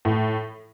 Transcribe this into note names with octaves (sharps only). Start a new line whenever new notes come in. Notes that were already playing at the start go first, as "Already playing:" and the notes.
A2